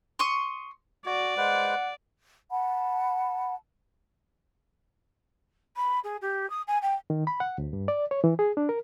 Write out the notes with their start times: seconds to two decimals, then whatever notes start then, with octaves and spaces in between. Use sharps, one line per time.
0.19 C6 C#6 D#6
1.06 F#4 D5
1.38 G#3 B4 C5 F#5
2.51 F#5 A5 B5
5.77 B5
6.04 G#4
6.22 G4
6.50 D#6
6.68 G#5
6.82 G5
7.10 D#3
7.27 B5
7.40 F#5
7.58 D2
7.73 G2
7.88 D5
8.11 C#5
8.24 E3
8.39 G#4
8.57 D4
8.69 A#4